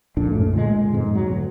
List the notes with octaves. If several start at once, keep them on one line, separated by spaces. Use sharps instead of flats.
C2 F2 A#2 D4
F#2 A2 A3
A#2 D3 D#3 G#3
F2 G#2 B2
F#3
D2